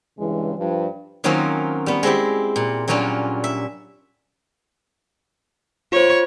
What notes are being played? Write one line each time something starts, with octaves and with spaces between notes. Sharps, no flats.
G2 C#3 E3 G#3
G2 F3
D#3 F#3 A#3 C4 C#4 F4
G3 B3
G#3 C4 E4 G4
A#2
A#2 F#3 G3 C#4 D4 F4
E5
F4 C5 C#5